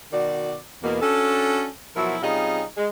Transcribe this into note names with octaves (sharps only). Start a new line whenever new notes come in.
B2 D#3 F#4 D5
E2 B2 A#3
C#4 D4 F#4 A4
B2 F3 F#3 E4 A#4 E5
C3 G3 C#4 D#4 F4 G#4
G#3